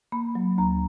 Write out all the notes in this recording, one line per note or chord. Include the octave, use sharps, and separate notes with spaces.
A#3 B5
F#3
D2 A#5